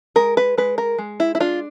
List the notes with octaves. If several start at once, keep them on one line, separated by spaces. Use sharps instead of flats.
G#3 A#4
B4
G#3 B4
A#4
G#3
E4
E4
D4 F4